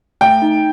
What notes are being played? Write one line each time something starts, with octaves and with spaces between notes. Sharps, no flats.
A3 G5
D#4